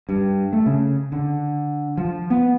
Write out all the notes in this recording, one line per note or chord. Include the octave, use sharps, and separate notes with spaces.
G2
A3
C#3
D3
F3
B3